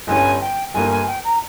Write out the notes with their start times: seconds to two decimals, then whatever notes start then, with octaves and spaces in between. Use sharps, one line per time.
0.07 G1 G2 G3 C#4 G#5
0.41 G5
0.74 G1 G2 G3 A#3 G#5
0.90 G#5
1.07 G5
1.24 A#5